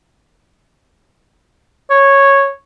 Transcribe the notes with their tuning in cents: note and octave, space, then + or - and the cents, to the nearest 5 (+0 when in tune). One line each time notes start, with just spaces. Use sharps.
C#5 -10